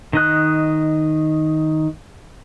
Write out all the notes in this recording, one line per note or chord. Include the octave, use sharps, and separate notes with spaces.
D#3 D#5 F#6